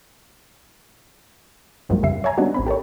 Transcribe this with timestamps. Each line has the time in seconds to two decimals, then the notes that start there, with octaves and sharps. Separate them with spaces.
1.89 B1 G2 F3 F#3 G#3 A#3
2.03 F2 C#3 G3 E5 C7
2.24 C#5 E5 G#5 A#5
2.38 G3 B3 C4 D4 D#4 F#4
2.54 A1 C4 B5
2.67 G4 A4 A#4 C#5